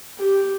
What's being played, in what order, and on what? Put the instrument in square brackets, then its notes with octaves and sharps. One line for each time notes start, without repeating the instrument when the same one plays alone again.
[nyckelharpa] G4